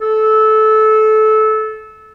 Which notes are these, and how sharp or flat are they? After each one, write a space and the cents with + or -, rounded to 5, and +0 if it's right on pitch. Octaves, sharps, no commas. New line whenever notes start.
A4 -20